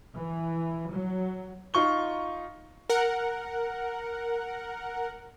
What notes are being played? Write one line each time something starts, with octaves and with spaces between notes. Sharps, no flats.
E3
F#3
D#4 F4 C#6 G7
A#4 F#5